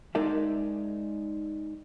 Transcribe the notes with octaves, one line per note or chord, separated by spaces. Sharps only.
G#3 D#4 A#4 D5 E5